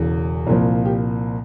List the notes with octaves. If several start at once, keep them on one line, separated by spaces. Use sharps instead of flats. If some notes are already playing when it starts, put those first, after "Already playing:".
Already playing: E1 E2 C#3
C2 A#2 F3
G4